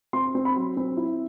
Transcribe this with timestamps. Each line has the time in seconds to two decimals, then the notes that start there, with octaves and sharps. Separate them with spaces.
0.13 C4 C6
0.35 C4
0.45 B5
0.56 F#3
0.77 C4
0.97 E4